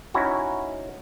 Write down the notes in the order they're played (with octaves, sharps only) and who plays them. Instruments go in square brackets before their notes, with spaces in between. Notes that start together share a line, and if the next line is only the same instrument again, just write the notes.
[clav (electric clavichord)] C#4 D#4 E4 F#4